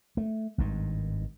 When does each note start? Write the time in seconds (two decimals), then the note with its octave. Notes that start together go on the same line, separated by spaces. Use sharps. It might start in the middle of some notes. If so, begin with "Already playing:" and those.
0.17 A3
0.58 G#1 G2 D#3